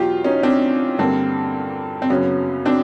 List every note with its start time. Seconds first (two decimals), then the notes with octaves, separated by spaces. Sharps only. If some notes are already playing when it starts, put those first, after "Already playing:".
Already playing: E2 B2 F#3 F4 G4
0.24 C#4 D#4
0.43 C4 D4
0.99 G2 D3 G3 A#3 C4
2.02 C4
2.10 F#2 C#3 F#3 B3 C#4
2.65 C4 D4